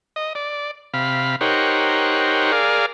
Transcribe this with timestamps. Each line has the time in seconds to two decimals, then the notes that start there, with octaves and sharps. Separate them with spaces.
0.16 D#5
0.35 D5
0.94 C3 F5 B5
1.41 D#4 G4 A#4 C5 C#5 F#5
2.52 G#4 A#4 D5 F5